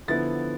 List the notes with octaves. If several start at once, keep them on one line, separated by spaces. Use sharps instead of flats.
D3 F3 B3 E4 A6